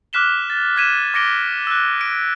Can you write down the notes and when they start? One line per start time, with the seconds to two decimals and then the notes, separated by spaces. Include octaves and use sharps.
0.13 D6 F6 F#6 B6 E7 G7
0.50 A6
0.76 F6 G#6 B6 D#7 E7
1.14 D6 A#6 C#7 D7 G7
1.67 E6 F#6
2.01 D7